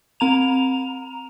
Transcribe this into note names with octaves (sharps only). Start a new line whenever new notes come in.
C4 A#5 F7